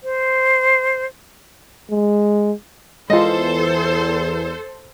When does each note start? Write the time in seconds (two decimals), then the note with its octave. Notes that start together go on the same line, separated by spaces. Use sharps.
0.03 C5
1.91 G#3
3.10 E2 G#3 F4 A4 C5 D#5